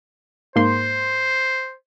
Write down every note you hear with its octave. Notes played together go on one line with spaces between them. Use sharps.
G#2 A#3 C5 C6